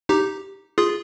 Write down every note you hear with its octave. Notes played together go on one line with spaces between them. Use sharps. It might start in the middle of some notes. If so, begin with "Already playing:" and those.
D#4 G4
F4 G#4